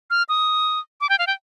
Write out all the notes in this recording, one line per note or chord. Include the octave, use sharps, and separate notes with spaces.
F6
D#6
D6
G5
F5
G5